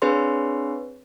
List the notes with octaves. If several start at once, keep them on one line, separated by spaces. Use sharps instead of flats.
C4 D4 G#4 B4 C#5 C6